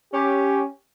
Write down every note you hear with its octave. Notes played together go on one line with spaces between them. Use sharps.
C#4 G4